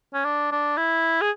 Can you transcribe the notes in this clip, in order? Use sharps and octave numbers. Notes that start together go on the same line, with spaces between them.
C#4
D4
D4
E4
G#4